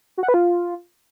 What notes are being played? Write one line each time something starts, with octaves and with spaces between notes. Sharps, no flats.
F#4
F#5
B4
F4